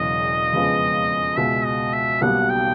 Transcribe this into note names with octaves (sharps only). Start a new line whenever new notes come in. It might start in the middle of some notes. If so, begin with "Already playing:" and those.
Already playing: E1 E2 C#3 F#3 D#5
F2 C#3 F3 G#3 B3
C#2 B2 G#3 E5
D#5
E5
B1 B2 G3 A#3 F#5
G5